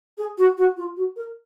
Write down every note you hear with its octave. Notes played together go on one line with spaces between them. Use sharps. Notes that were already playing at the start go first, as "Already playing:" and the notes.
G#4
F#4
F#4
F4
F#4
A#4